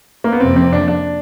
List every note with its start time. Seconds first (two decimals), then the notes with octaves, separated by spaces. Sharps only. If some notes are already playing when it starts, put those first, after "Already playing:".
0.24 A#3
0.32 B3
0.40 F2 C3 F3 A#3 C4
0.56 C4
0.73 D4
0.88 D4